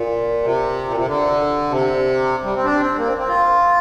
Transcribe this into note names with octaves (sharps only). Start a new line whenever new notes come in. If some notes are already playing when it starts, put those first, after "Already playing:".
Already playing: A#2
C3
A#2
C3
D3
C3
G3
C4
D4
C4
A#3
C4
C4
F4